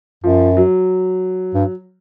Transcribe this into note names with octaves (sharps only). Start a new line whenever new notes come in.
F#2 F3
F#3
G2